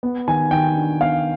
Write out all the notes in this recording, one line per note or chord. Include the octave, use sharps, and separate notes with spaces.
B3
D#3 G#5
D#3 G5
D4
B3 F5